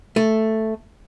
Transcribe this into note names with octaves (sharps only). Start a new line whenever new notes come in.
A3